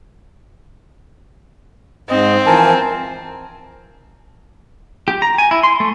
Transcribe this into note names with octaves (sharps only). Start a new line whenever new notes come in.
G#2 C4 D#5
E3 F3 A#4 G#5 A5
G4
A#5
G#5
E4
C6
A3